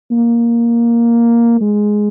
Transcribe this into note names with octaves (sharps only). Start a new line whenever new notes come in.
A#3
G#3